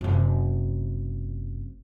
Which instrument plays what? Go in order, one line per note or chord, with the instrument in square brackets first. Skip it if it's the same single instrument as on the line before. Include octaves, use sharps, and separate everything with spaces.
[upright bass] F#1 C3